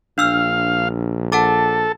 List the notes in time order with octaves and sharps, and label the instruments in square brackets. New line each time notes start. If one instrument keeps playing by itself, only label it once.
[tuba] A#1 [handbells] D4 E6 F6 [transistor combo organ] F5
[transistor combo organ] A4 [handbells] F#5 A5 D6